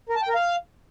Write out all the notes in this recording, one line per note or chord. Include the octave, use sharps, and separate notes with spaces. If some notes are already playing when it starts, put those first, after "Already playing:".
A#4
A5
G5
A#4
F5